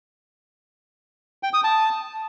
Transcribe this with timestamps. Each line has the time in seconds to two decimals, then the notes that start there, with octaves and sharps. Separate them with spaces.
1.43 G5
1.53 D#6
1.64 A5